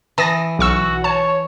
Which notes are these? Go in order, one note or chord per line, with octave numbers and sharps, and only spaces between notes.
E3 A5 D#6 A#6
B1 F#4 C#6 E6
C#5 A5